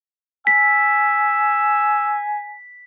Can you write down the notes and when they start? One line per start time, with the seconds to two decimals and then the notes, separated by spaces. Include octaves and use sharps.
0.47 G#5 E6 B6